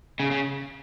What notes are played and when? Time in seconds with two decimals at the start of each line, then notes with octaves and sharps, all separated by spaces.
0.20 C#3
0.31 C#3